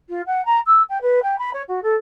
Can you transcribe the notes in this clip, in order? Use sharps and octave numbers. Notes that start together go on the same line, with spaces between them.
F4
F#5
A#5
E6
G5
B4
G5
B5
C#5
F#4
A4